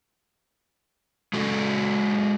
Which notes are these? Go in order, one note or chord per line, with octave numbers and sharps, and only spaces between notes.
G#3 F#4 A4